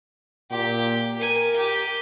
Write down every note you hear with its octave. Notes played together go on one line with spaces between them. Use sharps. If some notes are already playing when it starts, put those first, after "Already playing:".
A#2 G4
A#4 G#5
G4